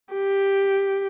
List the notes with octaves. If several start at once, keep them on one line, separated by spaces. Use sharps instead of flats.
G4